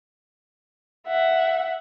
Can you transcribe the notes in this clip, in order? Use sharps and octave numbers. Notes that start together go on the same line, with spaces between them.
E5 F#5